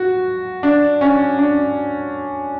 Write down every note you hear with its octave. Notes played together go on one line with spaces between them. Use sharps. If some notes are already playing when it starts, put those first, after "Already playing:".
Already playing: F#4
D4
C#4
D4